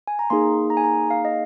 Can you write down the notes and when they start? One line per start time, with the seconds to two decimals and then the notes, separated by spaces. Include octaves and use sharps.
0.07 G#5
0.19 A#5
0.30 A#3 D#4 G#4 C6
0.70 A#5
0.77 G#5
0.84 A#5
1.11 F5
1.25 D#5